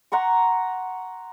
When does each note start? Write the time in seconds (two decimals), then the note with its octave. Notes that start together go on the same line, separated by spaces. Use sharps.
0.12 F#5 A#5 C6 C#6